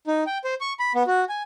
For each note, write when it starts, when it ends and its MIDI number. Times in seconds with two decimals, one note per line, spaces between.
0.07 0.23 63
0.27 0.38 79
0.44 0.54 72
0.61 0.73 85
0.79 0.93 83
0.95 1.03 59
1.07 1.25 66
1.29 1.42 80